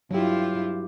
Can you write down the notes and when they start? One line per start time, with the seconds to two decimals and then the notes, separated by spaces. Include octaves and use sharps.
0.11 G2 F#3 E4 F4 G4